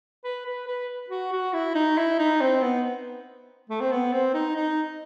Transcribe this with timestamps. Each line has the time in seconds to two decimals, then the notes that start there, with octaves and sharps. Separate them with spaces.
0.24 B4
0.46 B4
0.68 B4
1.10 F#4
1.32 F#4
1.53 E4
1.75 D#4
1.98 E4
2.19 D#4
2.41 C4
2.62 B3
3.70 A3
3.81 C4
3.91 B3
4.12 C4
4.34 D#4
4.56 D#4